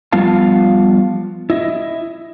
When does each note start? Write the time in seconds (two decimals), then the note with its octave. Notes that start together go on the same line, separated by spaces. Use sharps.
0.12 F3 G3 B3 F4 F5 A5
1.50 E4 D#5 E5